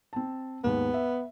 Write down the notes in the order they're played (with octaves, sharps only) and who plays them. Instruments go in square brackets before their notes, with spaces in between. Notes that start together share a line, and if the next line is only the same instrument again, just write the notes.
[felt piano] C4 A5
[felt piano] D#2 G#2 [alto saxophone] B3
[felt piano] E5